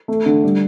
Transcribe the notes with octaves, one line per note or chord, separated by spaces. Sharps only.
A3
D3
G3